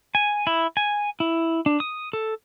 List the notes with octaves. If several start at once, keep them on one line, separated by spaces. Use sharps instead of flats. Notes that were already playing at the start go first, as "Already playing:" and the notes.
G#5
E4
G#5
E4
D4
D#6
A4